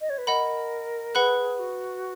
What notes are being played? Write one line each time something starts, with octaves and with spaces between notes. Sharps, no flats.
D#5
C#5
B4
A#4 D#5 F#5 B5
G#4 B4 F#5 B5 F#6
F#4